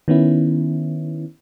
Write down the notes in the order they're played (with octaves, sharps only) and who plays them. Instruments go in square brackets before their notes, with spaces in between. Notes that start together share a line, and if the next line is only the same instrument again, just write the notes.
[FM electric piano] D#3 B3 C#4 E4